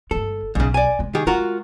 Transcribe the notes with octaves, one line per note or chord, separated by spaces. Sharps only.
G1 G#3 A4
B1 G#2 C#3 B3
D5 G#5
C3 G#3
D#3 G4 G#4
G#3 F4 F#4 A#4